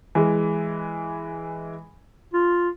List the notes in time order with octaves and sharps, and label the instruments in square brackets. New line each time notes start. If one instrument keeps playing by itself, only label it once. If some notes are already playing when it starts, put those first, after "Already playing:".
[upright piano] E3 G#3
[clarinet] F4